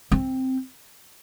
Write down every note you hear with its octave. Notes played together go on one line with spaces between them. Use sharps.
C4